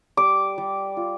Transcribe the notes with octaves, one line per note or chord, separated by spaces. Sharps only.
G3 D6
G3
F4